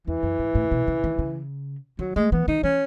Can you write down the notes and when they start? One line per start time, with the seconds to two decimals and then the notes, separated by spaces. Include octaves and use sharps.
0.07 E2 E3
0.23 F#2
0.39 G#2
0.55 A2
0.71 B2
0.87 C#3
1.04 D#3
1.19 C#3
1.99 D#3 F#3
2.16 G#3 A3
2.32 E3 B3
2.48 D#3 D#4
2.63 E3 C#4